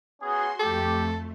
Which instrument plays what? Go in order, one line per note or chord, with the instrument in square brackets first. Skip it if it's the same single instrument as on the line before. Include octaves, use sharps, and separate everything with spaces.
[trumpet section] B3 C#4 G#4 [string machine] F#4 C6
[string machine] F2 A3 [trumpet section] G4 [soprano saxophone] A4